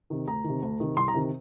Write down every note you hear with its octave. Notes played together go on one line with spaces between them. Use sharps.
C3 D#3
D2 A#5
C3 D#3
D2
C3 D#3
C2 C6
A#5
C3 D#3